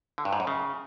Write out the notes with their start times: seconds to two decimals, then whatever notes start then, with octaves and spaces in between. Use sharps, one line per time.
0.18 D3
0.25 G2
0.33 G#2
0.40 F#2
0.47 C#3